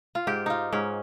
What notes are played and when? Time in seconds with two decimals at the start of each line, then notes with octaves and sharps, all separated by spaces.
0.15 F4
0.27 G#2 G4
0.46 D#4 F4
0.73 G#2 C#4